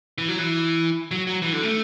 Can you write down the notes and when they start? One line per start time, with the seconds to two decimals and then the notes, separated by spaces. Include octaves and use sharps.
0.18 E3
0.28 F#3
0.39 E3
1.11 F#3
1.27 F#3
1.42 E3
1.53 D3
1.63 A3